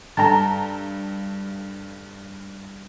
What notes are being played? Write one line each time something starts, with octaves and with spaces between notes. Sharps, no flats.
G2 A4 G5 A5 A#5